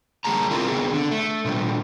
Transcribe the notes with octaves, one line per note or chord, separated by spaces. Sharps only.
D3 G3 A#3 G#4 A5 A#5
C4 E4 F4 A#4
C#3 B3 C4 G#4
D3
A3
A#2 D3 F3 G3